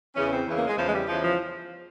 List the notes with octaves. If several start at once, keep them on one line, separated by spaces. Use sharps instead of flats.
E2 C#3 E3 C#4
C4
E2 C#3 E3
A#3
G#3
E2 C#3 E3 F3
G#3
G3
E2 C#3 E3 F3
F3